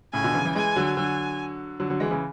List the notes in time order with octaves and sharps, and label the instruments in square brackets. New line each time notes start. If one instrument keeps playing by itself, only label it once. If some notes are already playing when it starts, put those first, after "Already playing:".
[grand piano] A2 C#3 [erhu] G#5
[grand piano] B2 D3
C#3 E3
C#3 E3
[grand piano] E3 G#3 [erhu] G#5
[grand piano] D3 F#3
[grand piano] D3 F#3 [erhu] G#5
[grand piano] D3 F#3
D3 F#3
E3 G#3
C#3 E3